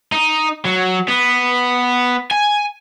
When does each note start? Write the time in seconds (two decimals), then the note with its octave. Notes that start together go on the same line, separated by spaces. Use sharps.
0.12 D#4
0.65 F#3
1.08 B3
2.31 G#5